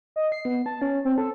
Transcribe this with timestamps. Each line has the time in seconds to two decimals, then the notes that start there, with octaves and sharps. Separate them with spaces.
0.16 D#5
0.32 C7
0.45 B3
0.66 A5
0.82 C#4
1.05 C4
1.18 A4